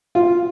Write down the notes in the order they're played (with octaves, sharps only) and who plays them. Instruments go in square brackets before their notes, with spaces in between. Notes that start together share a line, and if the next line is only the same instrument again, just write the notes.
[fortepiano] F4